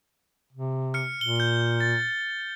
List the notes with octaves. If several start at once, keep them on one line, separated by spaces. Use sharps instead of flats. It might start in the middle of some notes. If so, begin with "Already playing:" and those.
C3
F6 C#7
A#2 G7
G6 G7
A6